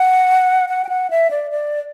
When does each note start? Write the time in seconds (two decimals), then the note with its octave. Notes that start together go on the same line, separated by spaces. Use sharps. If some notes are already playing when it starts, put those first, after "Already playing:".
Already playing: F#5
0.69 F#5
0.84 G5
0.89 F#5
1.10 E5
1.31 D5
1.51 D5